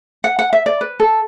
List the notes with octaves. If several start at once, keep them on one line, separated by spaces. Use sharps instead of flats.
F#5
F#5
E5
D5
B4
A4